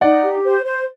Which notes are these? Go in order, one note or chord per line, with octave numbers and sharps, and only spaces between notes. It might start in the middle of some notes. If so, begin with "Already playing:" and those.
D#4 D5 F#5
G4
C5
C5